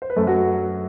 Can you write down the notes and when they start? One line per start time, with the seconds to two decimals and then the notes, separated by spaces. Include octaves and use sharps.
0.02 C5
0.10 B4
0.16 F#2 A3 A4
0.27 F#3 F#4